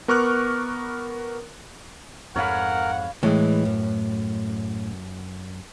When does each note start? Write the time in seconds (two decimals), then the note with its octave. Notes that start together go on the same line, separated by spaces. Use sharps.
0.08 B3 A#4 C#6 D6 F6 F#6
2.36 F2 G#2 A#4 C#5 F5 F#5 B5
3.23 A2 E3 G#3
3.65 F#2